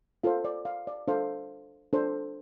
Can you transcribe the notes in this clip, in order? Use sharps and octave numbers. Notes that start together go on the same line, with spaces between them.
F4 A4 C5 F5
D5
F5
D5
D4 A4 C5 F5
D4 A4 C5